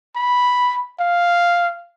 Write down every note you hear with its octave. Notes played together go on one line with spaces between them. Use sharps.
B5
F5